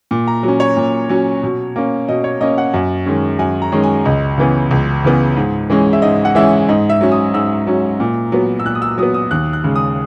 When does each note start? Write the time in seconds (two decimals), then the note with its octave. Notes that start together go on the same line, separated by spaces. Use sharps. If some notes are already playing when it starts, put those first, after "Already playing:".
0.11 A#2
0.28 A#5
0.43 F#3 C#4
0.60 C#5
0.77 A#2
1.09 F#3 C#4
1.43 B2
1.76 A#3 C#4
2.08 B2 D#5
2.24 C#5
2.40 A#3 C#4 D#5
2.58 F#5
2.74 F#2
3.06 D#3 G#3 C#4
3.39 F#2 G#5
3.62 A#5
3.72 D#3 G#3 C#4
3.84 G#5
4.05 C#2 D#5
4.38 C#3 E3 B3
4.71 C#2
5.04 C#3 E3 B3
5.36 G#2
5.70 E3 G#3 C#4
5.93 E5
6.02 G#2 D#5
6.25 F#5
6.35 E3 G#3 C#4 E5
6.69 G#2 D#5
6.90 E5
7.01 F#3 C#4
7.12 D#6
7.34 G#2 E6
7.67 F#3 C#4
8.00 A#2
8.32 F#3 B3
8.60 E6
8.65 A#2 F#6
8.75 D#6
8.82 E6
8.98 F#3 B3 D#6
9.14 D#6
9.31 D#2 F#6
9.53 F#6
9.64 C#3 G#3
9.76 D#6